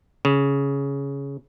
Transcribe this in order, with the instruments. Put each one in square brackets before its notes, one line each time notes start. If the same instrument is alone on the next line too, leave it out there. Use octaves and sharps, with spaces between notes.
[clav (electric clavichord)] C#3